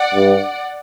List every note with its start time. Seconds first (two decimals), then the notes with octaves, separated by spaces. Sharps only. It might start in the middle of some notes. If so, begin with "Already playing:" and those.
Already playing: D5 F#5
0.15 G2